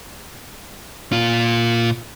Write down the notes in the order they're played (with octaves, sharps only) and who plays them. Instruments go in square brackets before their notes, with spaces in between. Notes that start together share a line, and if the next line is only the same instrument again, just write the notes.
[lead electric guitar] A#2 F4